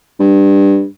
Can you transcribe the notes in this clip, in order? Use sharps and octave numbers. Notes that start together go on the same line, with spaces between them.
G2